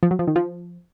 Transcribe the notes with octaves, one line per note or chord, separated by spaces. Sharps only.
F3
F#3
F3
D#3
F3